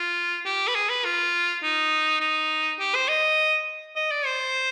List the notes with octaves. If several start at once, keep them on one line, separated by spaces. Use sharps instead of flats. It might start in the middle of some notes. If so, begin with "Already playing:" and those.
Already playing: F4
G4
B4
G#4
B4
F4
D#4
D#4
G4
C5
D#5
D#5
D5
C5